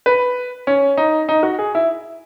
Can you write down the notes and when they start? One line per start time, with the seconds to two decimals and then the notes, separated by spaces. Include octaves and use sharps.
0.06 B4
0.67 C#4
0.97 D#4
1.29 D#4
1.43 F#4
1.59 G#4
1.75 E4